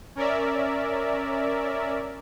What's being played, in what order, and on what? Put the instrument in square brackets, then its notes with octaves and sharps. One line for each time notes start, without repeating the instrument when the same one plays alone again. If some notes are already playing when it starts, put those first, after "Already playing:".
[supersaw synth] C#4 A#4 D5 E5